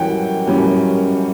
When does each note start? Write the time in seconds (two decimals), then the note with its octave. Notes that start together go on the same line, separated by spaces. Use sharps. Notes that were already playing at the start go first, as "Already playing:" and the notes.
Already playing: F#2 E3 G3 C#4 F#5 G5
0.47 F#2 E3 G3 C#4